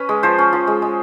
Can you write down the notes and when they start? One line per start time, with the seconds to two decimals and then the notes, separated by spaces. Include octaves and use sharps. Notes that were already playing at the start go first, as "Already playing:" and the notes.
Already playing: C#4 B4
0.09 G#3
0.23 F3 C5
0.38 C#4
0.53 F3
0.67 G#3
0.82 G#3